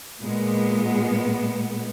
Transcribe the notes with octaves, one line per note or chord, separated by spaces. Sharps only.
A#2 G#3 B3